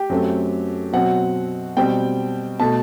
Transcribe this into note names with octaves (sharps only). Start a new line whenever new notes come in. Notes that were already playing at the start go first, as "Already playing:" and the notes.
Already playing: G4
F#2 F#3 A3 C4
B2 F#3 C4 F#5
B2 G3 C4 G5
B2 A3 A5